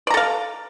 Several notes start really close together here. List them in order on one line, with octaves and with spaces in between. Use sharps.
D5 A#5 A4 F5